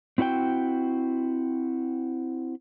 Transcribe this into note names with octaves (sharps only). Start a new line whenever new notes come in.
C4 E4 F#4 C#5 G5